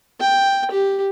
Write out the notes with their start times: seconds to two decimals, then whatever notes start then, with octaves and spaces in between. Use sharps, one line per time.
0.20 G5
0.71 G4